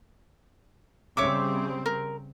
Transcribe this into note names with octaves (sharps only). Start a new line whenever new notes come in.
C#3 G3 C4 C#5 E5 D6
A#4